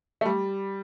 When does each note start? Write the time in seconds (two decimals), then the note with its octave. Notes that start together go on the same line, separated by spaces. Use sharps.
0.21 A3
0.25 G3